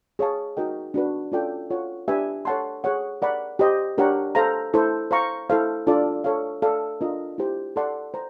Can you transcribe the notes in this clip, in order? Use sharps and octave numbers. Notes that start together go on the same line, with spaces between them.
G#4 C#5 F5 A5
D#4 F#4 A#4 D#5 G5
D4 F#4 B4
C#4 F4 A4 D5 G5
F4 A4 C#5 F#5
D4 G4 B4 E5 G#5
A4 C#5 F#5 A5 C6
G#4 C#5 F#5
A#4 D5 F#5 B5
G4 C5 D#5
D4 G4 A#4 C#5 F#5
A4 C5 F5 A#5
E4 A4 C5
C5 F5 A#5 C#6
E4 A4 C5 F5
D4 F4 A4 D5
A4 C#5 F5
A4 D5 F5
D4 F4 A#4 D#5
E4 G4 C5
A4 D5 F#5 A5 C6
C5 A#5